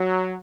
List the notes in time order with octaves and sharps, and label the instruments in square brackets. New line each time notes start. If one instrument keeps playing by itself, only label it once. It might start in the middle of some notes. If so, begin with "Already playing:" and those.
Already playing: [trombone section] F#3